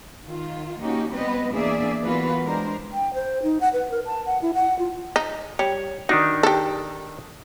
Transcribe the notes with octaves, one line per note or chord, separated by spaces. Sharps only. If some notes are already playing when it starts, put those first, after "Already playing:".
D#3 F4
A#3 C#4 D#4 F#4 G4
G3 B3 C4 B4 D#5
E2 A#3 D4 G#4 D5 E5
E3 A#3 B3 F4 F#4 B4
G#3 D4 A#4 C5
G5
C5
D#4
F#5
B4
A#4
A5
F#5
E4
F#5
F4
D#4
G3 C#5
D#3 D4 D#4 F#4
G4 A4